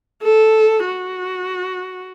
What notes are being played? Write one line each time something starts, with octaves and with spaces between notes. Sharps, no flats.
A4
F#4